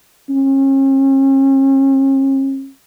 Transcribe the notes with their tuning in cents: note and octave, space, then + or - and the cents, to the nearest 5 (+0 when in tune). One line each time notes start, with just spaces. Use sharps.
C#4 -40